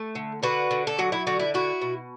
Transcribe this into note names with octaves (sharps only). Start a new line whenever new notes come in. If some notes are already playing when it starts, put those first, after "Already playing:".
Already playing: A3
D3
D3 F#4 B4
D3
A4
F#3 F#4
E4
D3 F#4
E4
E4 F#4
B2